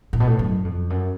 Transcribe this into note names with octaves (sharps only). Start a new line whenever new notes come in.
A2
B2
A2
F#2
F2
F#2